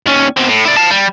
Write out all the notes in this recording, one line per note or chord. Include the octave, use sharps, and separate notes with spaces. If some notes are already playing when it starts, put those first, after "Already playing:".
D#2 C#4
B2 C4
A2
E4 D5
F5 A5
G3